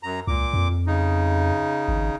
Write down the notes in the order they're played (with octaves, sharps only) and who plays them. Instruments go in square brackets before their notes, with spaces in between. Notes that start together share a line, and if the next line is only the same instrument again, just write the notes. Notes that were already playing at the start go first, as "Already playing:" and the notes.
[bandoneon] F#2 A#5
[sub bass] C#2 [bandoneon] A#2 D6
[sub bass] F2
[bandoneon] C#3 D#4
[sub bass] G#1